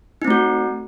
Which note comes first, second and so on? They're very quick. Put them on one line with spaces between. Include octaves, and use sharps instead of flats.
D#4 C4 A3 F#4